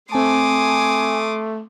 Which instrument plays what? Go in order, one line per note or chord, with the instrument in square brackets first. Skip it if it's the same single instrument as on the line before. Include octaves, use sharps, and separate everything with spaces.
[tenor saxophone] A3 [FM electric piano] C4 A5 [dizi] G#5 [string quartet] C6 D6 D#6